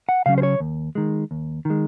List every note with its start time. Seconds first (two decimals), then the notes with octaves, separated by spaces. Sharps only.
0.09 F#5
0.26 C#3 F#3 C#4 F5
0.38 C5
0.43 C#5
0.60 D#2
0.95 D#3 G#3
1.31 D#2
1.65 D#3 G#3